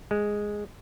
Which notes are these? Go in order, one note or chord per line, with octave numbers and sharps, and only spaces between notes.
G#3